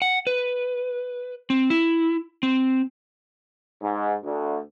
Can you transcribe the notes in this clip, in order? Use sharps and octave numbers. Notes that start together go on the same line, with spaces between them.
F#5
B4
C4
E4
C4
G#2
D2